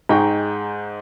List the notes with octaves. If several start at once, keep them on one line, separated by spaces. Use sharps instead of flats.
G#2 D#4 G#4 G5 A#5 C#6